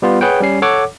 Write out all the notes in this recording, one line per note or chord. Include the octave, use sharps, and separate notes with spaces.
G3 B3 F4
G#4 B4 C#5 F#5 G5
G3 C#4 C7
A4 C#5 F#5 D6